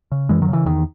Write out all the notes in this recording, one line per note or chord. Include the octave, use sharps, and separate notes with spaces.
C#3
F#2 E3 G#3
D#3 F#3
C#3 E3
E2 D#3